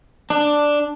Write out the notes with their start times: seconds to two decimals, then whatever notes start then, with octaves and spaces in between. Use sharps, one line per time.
0.30 D4